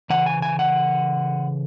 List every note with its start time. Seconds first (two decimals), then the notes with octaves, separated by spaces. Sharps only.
0.10 C#3 E3 F#5
0.26 G#5
0.42 G#5
0.59 F#5